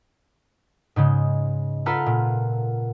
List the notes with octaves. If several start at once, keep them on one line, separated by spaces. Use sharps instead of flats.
G#2 C#3 G#3
F4 A4 B4 F5 F#5 A#5
A#2